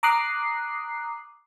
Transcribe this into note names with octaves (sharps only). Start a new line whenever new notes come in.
A#5 D6 D#6 F#6 C7